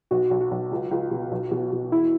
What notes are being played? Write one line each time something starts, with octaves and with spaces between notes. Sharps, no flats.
B1 F#4
B1
F#4
B1
C#2
C#2
B2
B1
B2
B2
E2 E4